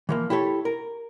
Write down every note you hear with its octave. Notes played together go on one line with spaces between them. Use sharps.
E3 F3 A#3
E4 G4 A4 C#5
A#4